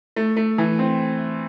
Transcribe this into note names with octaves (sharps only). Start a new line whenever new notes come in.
A3
A3
E3
C4